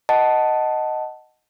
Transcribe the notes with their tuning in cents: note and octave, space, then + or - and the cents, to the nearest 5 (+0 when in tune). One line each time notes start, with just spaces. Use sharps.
D#5 +0 F#5 +5 A5 +0